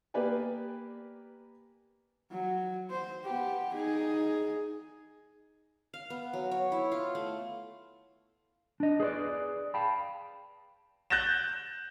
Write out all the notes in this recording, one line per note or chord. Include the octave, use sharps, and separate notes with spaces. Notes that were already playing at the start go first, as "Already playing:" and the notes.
A#3 B3 G4 B4 D5 G#5
F#3
C5
B3 G4
D#4 G#4
F5
B3
F#3
C#5
E4
F4
A3
D4 D#5
G#4 B4 C5 D5
F5 G5 A5 B5
F#6 G6 A6 A#6 E7